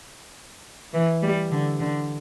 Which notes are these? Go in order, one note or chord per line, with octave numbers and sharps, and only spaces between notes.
E3
G3
D3
D3